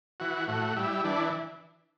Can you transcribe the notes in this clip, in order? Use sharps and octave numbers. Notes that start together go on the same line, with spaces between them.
E3 F#4
A2 F#4
G3 E4
E3 D4